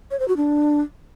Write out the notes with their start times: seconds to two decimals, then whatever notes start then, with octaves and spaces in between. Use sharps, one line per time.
0.11 C#5
0.20 C5
0.28 F#4
0.37 D4